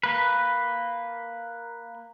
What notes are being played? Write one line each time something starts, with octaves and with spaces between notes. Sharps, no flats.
A#3 B4